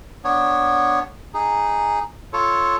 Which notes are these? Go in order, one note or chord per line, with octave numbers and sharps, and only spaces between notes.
B3 D4 C#5
D#4 G#4
F4 A4 C#5